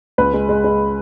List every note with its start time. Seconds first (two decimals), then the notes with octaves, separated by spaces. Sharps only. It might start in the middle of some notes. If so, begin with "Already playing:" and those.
0.18 C#2 B4
0.34 G#3
0.49 G#3
0.64 G#3